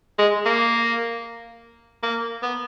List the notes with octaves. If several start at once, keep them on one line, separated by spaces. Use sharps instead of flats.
G#3
A#3
A#3
B3